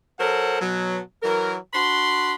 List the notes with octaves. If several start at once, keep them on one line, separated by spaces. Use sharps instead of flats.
F#3 A4 A#4 C5 F#5
B2 F#3
E3 F#3 A#4
D4 F#4 B5 C6